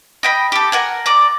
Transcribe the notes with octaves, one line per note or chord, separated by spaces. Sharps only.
D#5 G5 B5
G4 A4
A#4 F#5 G#5
D5 A#5